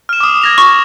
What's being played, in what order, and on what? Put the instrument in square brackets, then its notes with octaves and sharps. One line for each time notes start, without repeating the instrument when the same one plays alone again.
[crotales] F6 E7
D6 D#6
G#6 A#6 F7
[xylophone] C#6